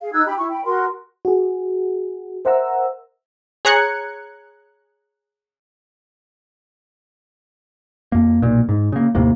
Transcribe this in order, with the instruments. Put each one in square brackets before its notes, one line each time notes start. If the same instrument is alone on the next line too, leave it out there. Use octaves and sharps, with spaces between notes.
[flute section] G#4 F5
D#4 E6 F#6 G#6
G4 B5
E4 C#6
G5 B5
F#4 A#4 C6
[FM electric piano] F#4 G#4
A#4 C5 E5 F#5 A#5 E6
[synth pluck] G#4 C#5 A#5 F#6 G#6 C#7
[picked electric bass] F2 A#3
B1 A#2
G#2
C#3 A#3
D#2 A2 C3 A#3